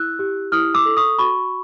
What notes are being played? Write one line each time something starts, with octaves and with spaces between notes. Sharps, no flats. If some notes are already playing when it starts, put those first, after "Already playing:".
Already playing: E4 E6 F#6
G4
E4 D#6 F6
D6 E6
A4
C#6 D#6
F#4 B5 C#6